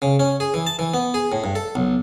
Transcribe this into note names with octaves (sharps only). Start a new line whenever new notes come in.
C#3
C#4
G#4
E3
A5
E3
B3
G#4
A2
G2
A4
B1